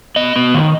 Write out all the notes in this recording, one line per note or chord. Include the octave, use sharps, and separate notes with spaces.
B3 D#5
B3
D#3